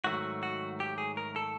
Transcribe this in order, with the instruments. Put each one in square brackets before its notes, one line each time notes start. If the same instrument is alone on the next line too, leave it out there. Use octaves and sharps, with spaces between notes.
[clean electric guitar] G#2 D#3 F#3 A3 F#4
F#4
G4
G#4
A#4
A4